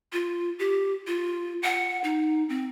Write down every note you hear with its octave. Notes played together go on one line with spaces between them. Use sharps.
F4
G4
F4
F#5
D#4
C4